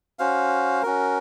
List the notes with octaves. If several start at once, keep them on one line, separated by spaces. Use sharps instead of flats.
C#4 F#4 C5 F5
C#4 F#4 A#4